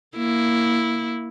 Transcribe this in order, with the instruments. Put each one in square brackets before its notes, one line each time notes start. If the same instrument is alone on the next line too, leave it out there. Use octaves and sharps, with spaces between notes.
[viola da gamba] A#3 E4